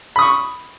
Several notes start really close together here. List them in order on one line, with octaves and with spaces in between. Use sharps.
B5 D#6 C#6